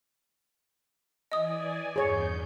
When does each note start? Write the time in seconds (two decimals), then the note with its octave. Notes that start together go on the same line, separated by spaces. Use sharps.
1.32 E3 D5 D#5 G#5 D#6
1.96 E2 G2 G#4 C#5 G6